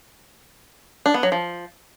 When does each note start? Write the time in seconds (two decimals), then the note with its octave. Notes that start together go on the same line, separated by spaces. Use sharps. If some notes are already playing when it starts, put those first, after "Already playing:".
1.06 D4
1.14 B3
1.23 F#3
1.32 F3